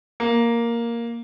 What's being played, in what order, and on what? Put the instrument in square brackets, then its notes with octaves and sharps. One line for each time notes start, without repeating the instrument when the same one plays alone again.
[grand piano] A#3